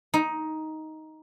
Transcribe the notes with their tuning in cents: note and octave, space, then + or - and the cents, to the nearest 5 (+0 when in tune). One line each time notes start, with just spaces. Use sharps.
D#4 +10